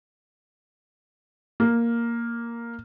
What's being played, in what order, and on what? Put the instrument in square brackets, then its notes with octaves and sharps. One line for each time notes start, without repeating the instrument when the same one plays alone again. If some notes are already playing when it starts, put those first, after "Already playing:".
[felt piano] A#3